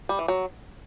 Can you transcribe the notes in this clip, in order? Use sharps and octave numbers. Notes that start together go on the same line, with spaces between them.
G3
E3
F#3